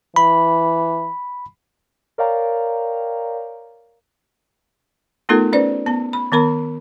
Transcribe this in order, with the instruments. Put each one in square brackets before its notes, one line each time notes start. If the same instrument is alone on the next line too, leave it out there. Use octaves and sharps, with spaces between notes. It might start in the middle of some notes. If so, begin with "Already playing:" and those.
[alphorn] E3 [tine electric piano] B5
[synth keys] A#4 C#5 D5 F5 G5 A#5
[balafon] A3 B3 D#4 F4 A4 A#4
C#4 B4 C5 D5
B3 A5
B5
D#3 B3 A#4 B5